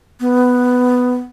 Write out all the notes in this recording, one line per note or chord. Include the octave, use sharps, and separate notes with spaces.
B3